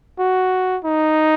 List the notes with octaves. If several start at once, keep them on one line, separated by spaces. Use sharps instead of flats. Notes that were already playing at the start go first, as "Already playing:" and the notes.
F#4
D#4